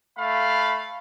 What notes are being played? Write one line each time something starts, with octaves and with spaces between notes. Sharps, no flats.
A3 F5 B5